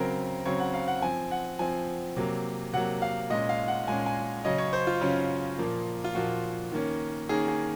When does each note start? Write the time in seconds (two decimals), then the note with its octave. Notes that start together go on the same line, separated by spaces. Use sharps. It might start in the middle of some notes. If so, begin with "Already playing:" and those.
Already playing: C#3 F#3 C4 A#4
0.45 C#3 F#3 C4 C#5
0.60 F#5
0.74 F5
0.88 F#5
1.02 F3 C4 G#5
1.31 F#5
1.59 F3 C4 G#5
2.16 C3 F#3 A#3
2.73 C3 F#3 A#3 F#5
3.02 F5
3.30 A#2 G#3 C#4 D#5
3.49 F5
3.68 F#5
3.87 A#2 G#3 C#4 G#5
4.06 G#5
4.44 C#3 F#3 C#4 D#5
4.58 C#5
4.73 C5
4.87 F4
5.01 C#3 F#3 C#4
5.58 A#2 F3 A#3
6.04 F4
6.15 A#2 F3 A#3 F#4
6.72 D#3 A#3 C#4
7.29 D#3 A#3 C#4 G#4
7.48 G#4